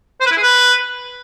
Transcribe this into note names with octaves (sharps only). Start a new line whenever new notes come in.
C5
B4
E4
G#4
B4